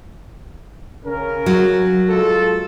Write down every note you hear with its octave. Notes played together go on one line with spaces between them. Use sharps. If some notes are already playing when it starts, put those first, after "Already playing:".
C#3 C#4 A#4
F#3
G#3 F4 A4